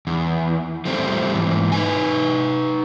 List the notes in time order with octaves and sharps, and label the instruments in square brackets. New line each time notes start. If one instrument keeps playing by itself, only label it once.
[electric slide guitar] E2
F3 G3 A3 C4
G#2 E3
D#4 B4 G#5